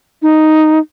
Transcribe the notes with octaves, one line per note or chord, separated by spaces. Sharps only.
D#4